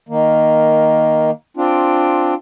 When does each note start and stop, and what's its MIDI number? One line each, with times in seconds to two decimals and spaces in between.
0.09 1.31 51
0.09 1.31 58
1.57 2.34 60
1.57 2.34 62
1.57 2.34 65